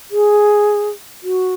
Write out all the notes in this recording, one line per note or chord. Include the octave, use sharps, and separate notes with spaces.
G#4
F#4